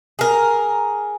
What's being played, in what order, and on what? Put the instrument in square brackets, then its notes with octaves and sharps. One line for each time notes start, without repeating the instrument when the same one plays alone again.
[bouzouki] G#4 A#4